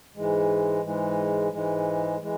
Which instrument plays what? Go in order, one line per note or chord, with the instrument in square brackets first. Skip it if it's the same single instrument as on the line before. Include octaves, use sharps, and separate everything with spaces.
[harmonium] G#2 E3 G#3
G#2 E3 G#3
G#2 E3 G#3
E3 G#3